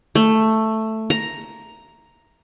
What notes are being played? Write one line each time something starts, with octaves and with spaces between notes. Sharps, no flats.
A3
A#5